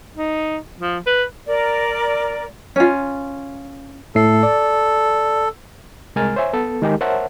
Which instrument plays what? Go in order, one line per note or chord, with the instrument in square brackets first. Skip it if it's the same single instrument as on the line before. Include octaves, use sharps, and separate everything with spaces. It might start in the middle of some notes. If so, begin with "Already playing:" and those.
[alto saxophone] D#4
F3
B4
[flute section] A#4 D5
[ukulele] C#4 F4
[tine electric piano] A2 A3 C7 [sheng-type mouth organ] A4
[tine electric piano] D5
[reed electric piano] C2 G#3 A#4 G#5 F6 A6
C5 C#5 E5 G#5
B3 A4
D#3 G#3 D#4 G4 G#4 A#4
A#4 C5 C#5 E5 F#5 A5